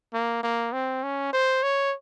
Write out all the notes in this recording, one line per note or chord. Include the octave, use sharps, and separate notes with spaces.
A#3
A#3
C4
C#4
C5
C#5